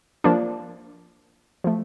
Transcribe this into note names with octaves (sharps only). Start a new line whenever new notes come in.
F3 A#3 D4
F3 A3